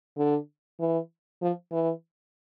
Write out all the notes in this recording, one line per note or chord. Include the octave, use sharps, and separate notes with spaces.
D3
E3
F3
E3